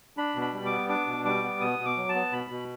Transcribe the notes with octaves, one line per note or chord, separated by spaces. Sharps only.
D4 B5
B2
B5
G3
D6
B3
D4 D6
B2
G3 D6
B3
B2 D#6
B2
D6
F#3
A5
B3
B2 B5
B2